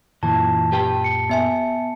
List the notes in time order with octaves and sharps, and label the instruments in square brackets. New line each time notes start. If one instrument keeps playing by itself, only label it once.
[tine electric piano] F#2 A#2 [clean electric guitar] E3 [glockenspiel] A5
[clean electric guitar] G4 B4 G5
[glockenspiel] C#7
[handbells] B3 E5 G#5